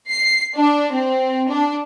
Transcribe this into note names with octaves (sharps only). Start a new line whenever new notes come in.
C7
D4
C4
D4